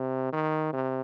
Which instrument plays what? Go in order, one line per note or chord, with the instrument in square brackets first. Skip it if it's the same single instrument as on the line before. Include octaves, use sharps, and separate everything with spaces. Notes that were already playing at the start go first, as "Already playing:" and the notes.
Already playing: [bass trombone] C3
D#3
C3